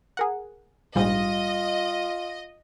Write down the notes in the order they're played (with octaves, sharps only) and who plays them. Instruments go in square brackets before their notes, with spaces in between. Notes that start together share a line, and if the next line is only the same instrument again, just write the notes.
[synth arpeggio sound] G#4 A#4 F#5
[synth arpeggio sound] A#1 G#2 [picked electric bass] G3 [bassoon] F4 [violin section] D#5